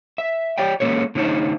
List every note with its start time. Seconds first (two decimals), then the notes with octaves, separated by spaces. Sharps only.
0.18 E5
0.58 G4 C#5 D5 G5
0.80 G#3 A#3 C#4 A4 C#5
1.15 D3 A3 C#4 D#4 C5 A5